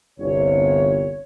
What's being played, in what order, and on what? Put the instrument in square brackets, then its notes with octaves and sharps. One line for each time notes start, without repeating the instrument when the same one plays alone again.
[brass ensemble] G1 C2 C3 [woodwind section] C#5